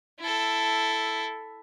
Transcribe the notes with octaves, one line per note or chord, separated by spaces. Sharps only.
E4 A4